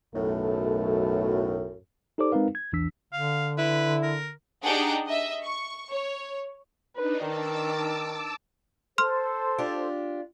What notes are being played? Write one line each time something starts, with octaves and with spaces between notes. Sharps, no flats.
B1 F#2 A2 A3
D#4 G4 A4 C5 D5 D6
G#3 C4 D#4 A#4 B4 F5
G#6
A#1 E2 E3 D4 E6 B6
D3 F5
E4 B4
A#4
D4 D#4 G4 G#4 F#5 G5
D#5 E5
C#6
C#5
D4 D#4 B4
D#3 A5 D6 E6
A4 C5 C6 F6
D4 F4 G4